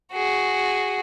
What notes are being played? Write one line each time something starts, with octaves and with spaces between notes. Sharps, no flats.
F#4 G#4